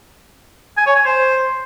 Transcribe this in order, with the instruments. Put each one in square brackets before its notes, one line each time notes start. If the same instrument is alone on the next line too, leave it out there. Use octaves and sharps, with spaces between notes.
[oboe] G#5
C#5
G#5
C5